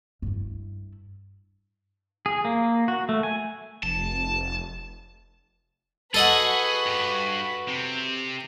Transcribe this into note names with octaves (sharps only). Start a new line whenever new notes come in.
G2 E4
G#4
A#3
F#4
A3
G#5
F1 A5
F#4 G#4 A4 B4 D#5 F#5
G2
C3